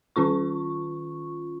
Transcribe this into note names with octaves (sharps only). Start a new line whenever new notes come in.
D#3 C#4 F4 C#6